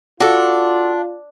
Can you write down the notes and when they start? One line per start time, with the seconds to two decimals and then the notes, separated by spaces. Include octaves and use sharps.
0.20 D4 F4 F#4 A4